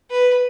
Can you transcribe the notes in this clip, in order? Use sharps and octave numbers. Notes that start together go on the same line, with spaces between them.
B4